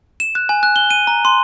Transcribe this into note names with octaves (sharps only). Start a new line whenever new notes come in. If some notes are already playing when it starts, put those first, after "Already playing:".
E7
F#6
G#5
F#6
G7
D#7
A#5
C6